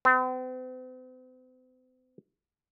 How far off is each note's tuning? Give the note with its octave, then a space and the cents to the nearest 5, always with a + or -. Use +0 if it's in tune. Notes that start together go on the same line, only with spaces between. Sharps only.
C4 -45